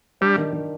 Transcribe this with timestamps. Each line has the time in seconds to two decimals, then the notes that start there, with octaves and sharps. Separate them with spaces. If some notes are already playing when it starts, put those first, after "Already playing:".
0.21 G3 D4
0.38 D#3
0.53 D#3